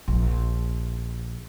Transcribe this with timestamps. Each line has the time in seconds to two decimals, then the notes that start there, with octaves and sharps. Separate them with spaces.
0.08 A#1